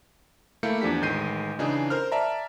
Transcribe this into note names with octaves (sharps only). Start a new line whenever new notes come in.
A3 A#3 E4 F5 G6 C#7
E2 F3 D4 G4 B6
A1 D#3 G#3 G6 C7 D#7
C#3 E3 D4 D#4 G#4
A#4 C5 F6
D5 E5 A5 A#5